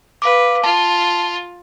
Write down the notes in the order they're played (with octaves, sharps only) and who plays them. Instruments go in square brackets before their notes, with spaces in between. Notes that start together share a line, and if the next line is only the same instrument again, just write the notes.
[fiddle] B4 [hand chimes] F5 D6
[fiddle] F4 [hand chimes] A5